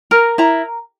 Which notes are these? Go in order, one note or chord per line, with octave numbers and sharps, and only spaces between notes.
A#4 A#5
E4 A#5